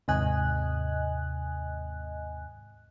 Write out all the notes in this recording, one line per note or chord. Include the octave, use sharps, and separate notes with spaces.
D#2 G#2 C3 D#5 G#5 F#6